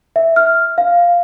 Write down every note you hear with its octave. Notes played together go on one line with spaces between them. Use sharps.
E5
F6
F5